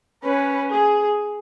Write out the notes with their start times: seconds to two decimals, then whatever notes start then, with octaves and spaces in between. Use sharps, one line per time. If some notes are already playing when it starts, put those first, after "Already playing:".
0.24 C#4 B4
0.73 G#4